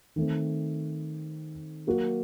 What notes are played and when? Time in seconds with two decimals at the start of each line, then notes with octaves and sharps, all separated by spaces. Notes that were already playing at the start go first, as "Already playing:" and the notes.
0.16 D#3 A3 C4
1.87 F#3 A#3 F#4